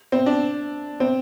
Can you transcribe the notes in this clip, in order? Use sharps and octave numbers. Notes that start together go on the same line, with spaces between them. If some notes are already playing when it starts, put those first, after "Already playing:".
C4
D4
C4